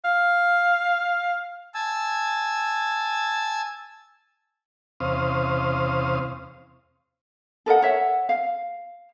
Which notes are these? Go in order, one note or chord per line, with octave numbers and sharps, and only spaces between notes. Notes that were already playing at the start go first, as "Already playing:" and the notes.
F5
G#5 A5 E6
E2 C3 C#4 C5 F5 D#6
A4 A#4 D#5 F#5
C#5 E5 F#5
F5